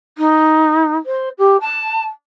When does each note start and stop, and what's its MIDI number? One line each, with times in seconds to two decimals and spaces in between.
0.18 0.95 63
1.06 1.29 72
1.38 1.57 67
1.61 2.04 81